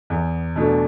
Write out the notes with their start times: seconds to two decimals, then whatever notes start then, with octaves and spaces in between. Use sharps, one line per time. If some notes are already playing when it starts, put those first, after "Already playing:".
0.10 E2
0.56 B2 A3 D4